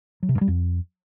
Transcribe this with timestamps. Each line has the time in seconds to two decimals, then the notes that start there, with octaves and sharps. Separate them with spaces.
0.23 F#3
0.29 C3
0.35 G2
0.41 G3
0.48 F2